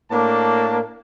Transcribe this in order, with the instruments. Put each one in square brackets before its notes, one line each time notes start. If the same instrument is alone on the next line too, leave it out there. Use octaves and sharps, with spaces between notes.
[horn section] A2 A#3 D4 A5